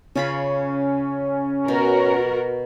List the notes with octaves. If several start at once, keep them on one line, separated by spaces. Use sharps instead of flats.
C#3 C#4 F4 B5
B2 F#4 A#4